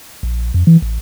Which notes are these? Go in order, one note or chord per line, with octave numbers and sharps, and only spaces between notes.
A#1
F2
E3
A1